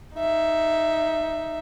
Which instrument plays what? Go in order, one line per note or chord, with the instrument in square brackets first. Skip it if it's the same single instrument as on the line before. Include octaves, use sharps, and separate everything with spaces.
[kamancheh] D#4 E5